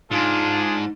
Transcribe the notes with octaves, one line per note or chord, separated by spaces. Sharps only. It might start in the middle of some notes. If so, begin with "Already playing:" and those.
G#2 D4 D#4 F4 G#4